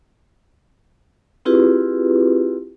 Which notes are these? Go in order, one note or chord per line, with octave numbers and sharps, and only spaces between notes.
C4 E4 F4 G4 G#4 B4